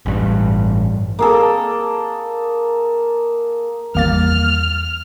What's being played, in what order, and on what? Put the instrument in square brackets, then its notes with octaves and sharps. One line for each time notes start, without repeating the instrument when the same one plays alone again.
[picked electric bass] A1 G2
[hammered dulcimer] A#3 G#4 A4
[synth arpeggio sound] G#1 A#3 A6 [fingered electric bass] E2 G3 [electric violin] F6